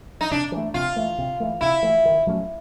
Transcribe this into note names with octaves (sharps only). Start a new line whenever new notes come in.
D#4
C3 D4
E3 A3
C3 F4
E3 A3
C3
E3 A3
C3 E4
E3 A3
D#3
F#3 A3 C#4